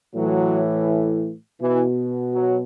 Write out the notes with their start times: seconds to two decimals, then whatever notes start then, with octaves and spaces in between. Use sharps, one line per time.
0.16 A2 E3 F#3
1.62 B2 E3
2.35 F#3